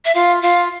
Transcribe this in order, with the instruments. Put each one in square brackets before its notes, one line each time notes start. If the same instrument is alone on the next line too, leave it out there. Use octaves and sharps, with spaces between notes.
[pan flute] E5
[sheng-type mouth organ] F4 [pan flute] F5
[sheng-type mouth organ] F4 [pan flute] F5